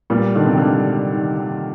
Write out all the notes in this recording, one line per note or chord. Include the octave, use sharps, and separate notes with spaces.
A#2 G3
D3 D#3
C3
D3 G3
G3
D#3
D#3